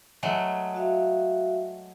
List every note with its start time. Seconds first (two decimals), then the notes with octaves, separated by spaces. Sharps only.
0.23 F#3 G#3 A3
0.75 F#4 E5 F5